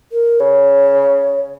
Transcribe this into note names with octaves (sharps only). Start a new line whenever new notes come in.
A#4
C#3 C#5